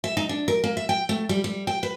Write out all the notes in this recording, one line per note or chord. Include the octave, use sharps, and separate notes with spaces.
E5
D#4
D4
A#4
A#3
E5
G5
A3
G3
G3
G5
B4